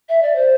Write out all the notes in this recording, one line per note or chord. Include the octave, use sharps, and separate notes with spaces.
E5
D5
C5